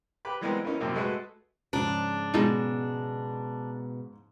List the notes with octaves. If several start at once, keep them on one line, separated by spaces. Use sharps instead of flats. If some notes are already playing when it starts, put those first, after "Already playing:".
G4 B4 B5 D6
E3 G3 G#3 B3 C4 A#4
E3 A#3 C#4 D#4
A#1 F#2 C3 A#3
G#3 A3 F#4 G#4 A4 B4
G#2 C#3 F3 D4
B2 G#3 D#4 F4 A4